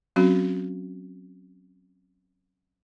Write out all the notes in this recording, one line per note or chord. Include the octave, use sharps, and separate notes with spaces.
F#3 C4 C#4 F#4